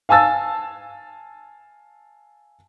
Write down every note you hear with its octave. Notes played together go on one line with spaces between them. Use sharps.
F5 G#5 A5 E6 A6